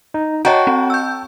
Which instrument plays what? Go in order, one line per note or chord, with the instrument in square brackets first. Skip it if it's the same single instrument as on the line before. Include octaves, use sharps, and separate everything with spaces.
[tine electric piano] D#4
[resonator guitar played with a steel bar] F#4 [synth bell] C#5 D#5 A#5 [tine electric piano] G5 A5
[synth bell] C4
E6 G6